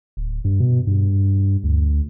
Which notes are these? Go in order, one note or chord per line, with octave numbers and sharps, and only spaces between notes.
D1
G2
B2
G2
D2